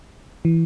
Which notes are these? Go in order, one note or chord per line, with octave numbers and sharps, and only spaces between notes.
E3